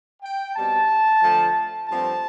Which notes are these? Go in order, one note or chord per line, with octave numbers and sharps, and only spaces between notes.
G5
B2 G3 C4 A5
D3 F3 A3
G2 F3 A3 C4 A5